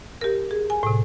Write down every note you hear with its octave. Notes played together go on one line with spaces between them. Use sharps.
G4 A#4
G#4
G#5
A2 C3